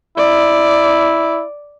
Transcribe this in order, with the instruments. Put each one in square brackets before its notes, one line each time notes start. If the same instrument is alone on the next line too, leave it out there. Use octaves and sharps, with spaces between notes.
[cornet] E4 [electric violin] D5